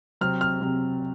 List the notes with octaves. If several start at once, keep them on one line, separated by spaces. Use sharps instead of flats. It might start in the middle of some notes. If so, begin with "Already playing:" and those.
C3 F#3 C4 F6
F6
C3 F#3 C4